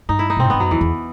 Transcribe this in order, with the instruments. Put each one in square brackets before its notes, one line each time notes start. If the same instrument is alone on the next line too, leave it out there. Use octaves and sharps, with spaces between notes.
[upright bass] G2 [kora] D#4
[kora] E4
D#4
[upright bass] B2 [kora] C4
[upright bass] A2
[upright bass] G2 [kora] B3
[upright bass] F#2 [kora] F#3
[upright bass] E2 [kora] E3
[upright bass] E2